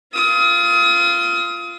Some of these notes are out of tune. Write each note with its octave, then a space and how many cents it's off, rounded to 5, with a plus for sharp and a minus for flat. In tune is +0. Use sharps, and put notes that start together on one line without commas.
F4 -15 D#6 +35